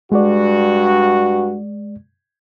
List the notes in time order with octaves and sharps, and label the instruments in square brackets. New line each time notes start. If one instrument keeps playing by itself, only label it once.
[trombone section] G2 F#4 [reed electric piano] G#3 D5